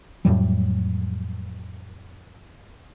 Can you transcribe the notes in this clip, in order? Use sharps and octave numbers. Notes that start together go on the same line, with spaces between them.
F2 A2 F#3 G3